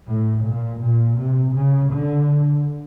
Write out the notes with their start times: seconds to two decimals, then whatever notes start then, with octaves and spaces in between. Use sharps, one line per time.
0.10 A2
0.46 A#2
0.83 A#2
1.20 C3
1.58 C#3
1.95 D3